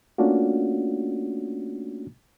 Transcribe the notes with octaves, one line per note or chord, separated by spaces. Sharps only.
A3 A#3 C#4 D4 F4 F#4